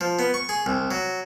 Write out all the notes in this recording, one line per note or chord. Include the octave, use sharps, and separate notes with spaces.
F3
B3
C#6
G#4
C2
F#3